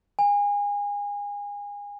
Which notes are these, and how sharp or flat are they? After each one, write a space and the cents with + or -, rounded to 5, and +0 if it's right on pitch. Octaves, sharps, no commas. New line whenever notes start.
G#5 -30